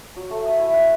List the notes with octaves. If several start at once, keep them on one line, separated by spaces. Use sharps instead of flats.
F#3
A3
D#6
E4
F#5